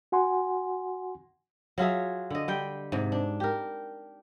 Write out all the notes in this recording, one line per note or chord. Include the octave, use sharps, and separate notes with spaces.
F#4 F#5 G#5 C6
F#3 F4 G#4 E5
D3 D#5
G3 G5
G#2 C3
D4
G4 A#4